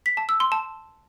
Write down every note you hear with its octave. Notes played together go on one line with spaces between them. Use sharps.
B6
A5
E6
C6
A5